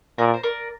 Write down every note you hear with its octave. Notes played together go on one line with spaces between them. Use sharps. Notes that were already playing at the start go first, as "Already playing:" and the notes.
A#2 A#4 D5
C5
A#4 D5